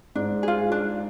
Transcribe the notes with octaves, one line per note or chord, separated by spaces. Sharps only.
G#2 D4
F4 G#4
D4